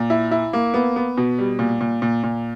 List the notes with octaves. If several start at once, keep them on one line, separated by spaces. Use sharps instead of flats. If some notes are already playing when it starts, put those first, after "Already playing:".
Already playing: A#2
E4
E4
A#3
B3
B3
B2
G3
A#2
A#2
A#2
A#2